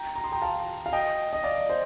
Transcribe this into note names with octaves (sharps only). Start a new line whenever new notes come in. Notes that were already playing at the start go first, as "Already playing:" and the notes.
Already playing: G5 A#5
A#5
C6
G5 A#5
F5 A5
F5
D#5 G5
D#5
D5 F5
C5 D#5